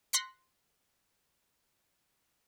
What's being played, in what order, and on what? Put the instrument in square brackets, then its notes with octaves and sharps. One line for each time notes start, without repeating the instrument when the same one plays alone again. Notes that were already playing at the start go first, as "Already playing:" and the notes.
[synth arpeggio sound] C6 F#6 A#6 B6 C#7